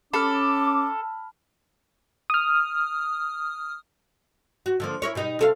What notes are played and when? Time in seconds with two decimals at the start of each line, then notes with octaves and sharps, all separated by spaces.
0.14 C#4 A4 B5 D6 F6
2.30 D#6 F6
4.66 F#4
4.80 D3 F3 A#3
5.02 E4 A#4 C#5
5.15 B2 G3 D#4
5.39 C3 A4 F5